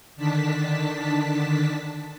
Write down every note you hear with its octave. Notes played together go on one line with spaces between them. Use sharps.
D3 D#3 D4 A5 B6